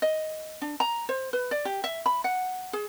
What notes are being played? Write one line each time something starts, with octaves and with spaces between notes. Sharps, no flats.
D#5
D4
A#5
C5
B4
D5
G4
E5
B5
F#5
G#4